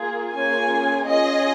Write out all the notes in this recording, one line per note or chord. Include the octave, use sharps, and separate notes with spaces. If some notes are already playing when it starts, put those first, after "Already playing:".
Already playing: A#3 F4 G#4
A#3 C#4 F4 G#4 G#5
C#4 F4 G#4 D#5